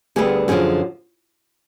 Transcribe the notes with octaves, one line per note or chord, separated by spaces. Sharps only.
D2 D3 G3 B3 G#4
F#2 D3 F3 G#4